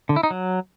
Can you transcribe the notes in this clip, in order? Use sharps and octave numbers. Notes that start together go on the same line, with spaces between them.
D3
E4
D#4
F#3